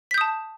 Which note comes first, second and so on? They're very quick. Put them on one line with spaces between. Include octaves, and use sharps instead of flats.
B6 G6 D#6 A5